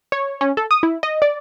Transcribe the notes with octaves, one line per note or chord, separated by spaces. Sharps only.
C#5
C#4
A4
D#6
E4
D#5
D5